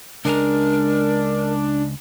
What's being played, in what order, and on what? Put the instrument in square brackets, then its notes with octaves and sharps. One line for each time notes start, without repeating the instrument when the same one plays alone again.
[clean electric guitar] C#2 G#3 A#5 [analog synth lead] D4 [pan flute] A#4